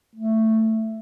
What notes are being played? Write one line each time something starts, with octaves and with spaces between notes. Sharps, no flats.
A3